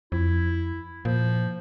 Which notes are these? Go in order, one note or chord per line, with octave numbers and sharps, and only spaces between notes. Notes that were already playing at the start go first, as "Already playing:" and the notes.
F2 E4
A#2 F3